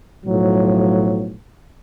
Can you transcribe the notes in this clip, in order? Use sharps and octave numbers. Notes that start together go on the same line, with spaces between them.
B1 A2 F3 F#3